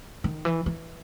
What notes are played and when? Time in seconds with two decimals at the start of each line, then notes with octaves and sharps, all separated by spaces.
0.24 D#3
0.45 E3
0.66 E3